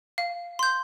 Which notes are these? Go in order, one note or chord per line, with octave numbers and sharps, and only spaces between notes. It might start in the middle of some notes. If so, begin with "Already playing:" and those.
F5
C6 G6